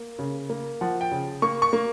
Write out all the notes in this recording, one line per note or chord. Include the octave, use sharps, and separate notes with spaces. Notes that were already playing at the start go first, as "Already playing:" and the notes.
Already playing: A#3
C#3
A#3
F3 F#5
G5
C#3
A#3 C#6
C#6
A#3